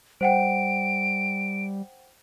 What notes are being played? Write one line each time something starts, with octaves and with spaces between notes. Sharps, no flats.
G3 C5 F#5 G5 D7